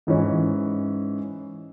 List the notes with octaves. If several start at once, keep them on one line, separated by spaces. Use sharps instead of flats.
G#2 E3 G#3 C#4